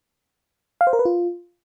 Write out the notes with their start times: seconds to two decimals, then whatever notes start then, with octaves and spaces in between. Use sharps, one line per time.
0.81 F5
0.87 C5
0.93 A#4
0.99 B4
1.05 F4